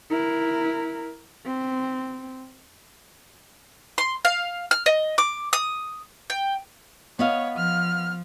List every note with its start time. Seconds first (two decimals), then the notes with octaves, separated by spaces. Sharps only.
0.10 E4 A#4
1.46 C4
3.98 C6
4.25 F5
4.71 F6
4.86 D#5
5.18 D6
5.53 D#6
6.30 G5
7.19 B3 C#5 D#5 F5
7.57 F3 F6